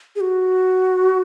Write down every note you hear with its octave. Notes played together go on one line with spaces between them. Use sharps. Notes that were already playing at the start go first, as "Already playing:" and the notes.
G#4
F#4